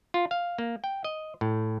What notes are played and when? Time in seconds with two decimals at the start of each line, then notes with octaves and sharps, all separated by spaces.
0.14 F4
0.31 F5
0.58 A#3
0.84 G5
1.04 D#5
1.41 A2